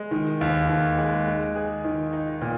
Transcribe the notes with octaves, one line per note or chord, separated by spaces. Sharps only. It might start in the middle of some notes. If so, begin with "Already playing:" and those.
Already playing: G#3
D#3
D#2
D#2
G#3
G#3
G#4
D#3
D#4
A#2